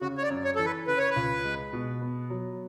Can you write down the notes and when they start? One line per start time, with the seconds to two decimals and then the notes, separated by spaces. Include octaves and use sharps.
0.01 C#3 F#4
0.18 C#5
0.23 D5
0.30 F#2
0.44 C#5
0.55 E3 A4
0.65 B4
0.87 C#3 B4
0.98 C#5
1.10 B4
1.16 C#2
1.44 G#3
1.73 B2
2.02 B3
2.30 F#3